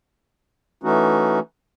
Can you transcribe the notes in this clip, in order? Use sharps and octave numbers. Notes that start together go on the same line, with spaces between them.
E3 A3 C#4 D#4 F#4